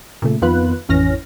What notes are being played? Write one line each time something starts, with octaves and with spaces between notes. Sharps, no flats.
A#2 C#3 A3
F2 D#3 B3 F4 B4 F#6
A1 F2 E3 C#4 F6 A#6